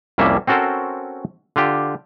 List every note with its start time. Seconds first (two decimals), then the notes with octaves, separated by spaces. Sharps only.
0.18 C2 F2 G3 A#3 C#4 E5
0.47 C4 C#4 F#4 A4 A#4 C5
1.56 D3 F4 G4